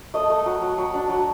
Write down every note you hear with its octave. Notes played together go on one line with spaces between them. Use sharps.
A3 D#5
A3
F#3
F#3
F#3
D4
F#3